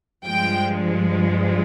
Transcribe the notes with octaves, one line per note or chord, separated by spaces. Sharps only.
G2 F3 G#3 G5